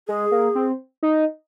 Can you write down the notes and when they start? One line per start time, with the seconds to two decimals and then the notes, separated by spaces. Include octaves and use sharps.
0.08 G#3 G#4
0.32 A#3
0.55 C4
1.03 D#4